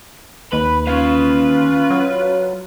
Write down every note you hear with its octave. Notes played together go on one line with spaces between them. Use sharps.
D#2 B4 B5
C#4 F4 B4 F5
F#3